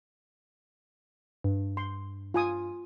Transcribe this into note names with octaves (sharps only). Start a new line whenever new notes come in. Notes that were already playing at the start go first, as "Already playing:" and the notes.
G2
C6
F4 G#5 D#6